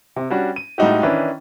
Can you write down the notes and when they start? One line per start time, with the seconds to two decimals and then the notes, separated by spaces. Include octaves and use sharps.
0.16 C3
0.30 G3 C#4 D4 F#4
0.56 D#7
0.78 A2 G3 G#3 D#4 F#4 G4
1.03 D#3 E3 C#4 D4 E4 B4